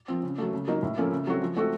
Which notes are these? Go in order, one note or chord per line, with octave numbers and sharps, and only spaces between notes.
F3 C4
C#3
F#3 A3
C#3
F#3 A#3 D#4
A2
F3 A#3 C#4 A4
C#3
F#3 C4 F#4 A4
F3
A3 C4 F#4 A4